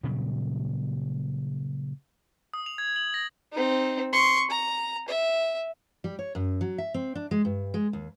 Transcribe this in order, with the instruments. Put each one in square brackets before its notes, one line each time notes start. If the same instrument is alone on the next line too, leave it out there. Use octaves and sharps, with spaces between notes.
[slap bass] A#2 C#3 F#3 G3
[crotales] D#6
F7
G#6
F#7
A#6
[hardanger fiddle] C4 D#4
C6 C#6
A#5
E5
[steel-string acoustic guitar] G3
C#5
F#2
F#3
E5
C4
D4
G#3
G2
G#3
D#2